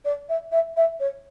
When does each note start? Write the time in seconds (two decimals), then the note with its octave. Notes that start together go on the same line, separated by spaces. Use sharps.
0.04 D5
0.29 E5
0.51 E5
0.76 E5
0.99 C#5